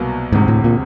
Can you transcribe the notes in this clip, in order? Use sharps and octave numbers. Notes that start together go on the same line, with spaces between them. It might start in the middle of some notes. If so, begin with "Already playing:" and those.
Already playing: C2 B2 F#3 A#3
E1 D2 G#2 C3
A2
A#2